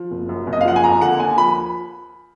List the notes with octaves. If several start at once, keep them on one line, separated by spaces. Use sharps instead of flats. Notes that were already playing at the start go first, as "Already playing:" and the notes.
Already playing: F3
F#1
F#2
F#1
D#5
F5
F3 F#5
G#5
D#2 A#5
D3 F#5
D#2 G#5
F3 B5